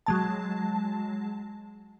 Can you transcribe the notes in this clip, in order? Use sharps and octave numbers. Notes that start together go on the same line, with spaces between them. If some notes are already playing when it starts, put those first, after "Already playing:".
F#3 G#3 A5